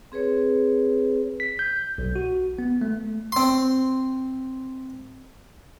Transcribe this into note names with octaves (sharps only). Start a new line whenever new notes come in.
C4 G#4 B4 C#5
B6
G6
B1
F#4
B3
A3
C4 C6